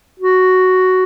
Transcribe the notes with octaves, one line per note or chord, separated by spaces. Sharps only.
F#4